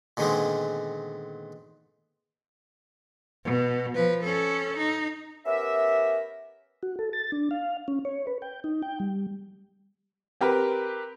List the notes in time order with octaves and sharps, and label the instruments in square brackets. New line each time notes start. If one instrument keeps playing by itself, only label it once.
[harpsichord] A#2 D3 D#3 G#3 B3 C4
[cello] B2
F3 B4
C#4 A4
D#4
[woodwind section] B3 C#4 G4 A#4 E5
[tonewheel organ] F#4
A4
A6
D4
F5
C#4
C#5
B4
G5
D#4
G5
G3
[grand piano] C4 G4 A#4 B4